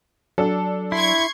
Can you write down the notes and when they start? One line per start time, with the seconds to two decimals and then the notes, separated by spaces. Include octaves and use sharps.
0.38 F#3 D4 A4
0.92 E4 C6 C#6 G#6